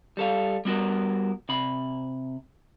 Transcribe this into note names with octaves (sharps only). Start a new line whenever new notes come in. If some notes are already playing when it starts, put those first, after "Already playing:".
G3 A4 F5
G3 B3 F#4 A#4
C3 B5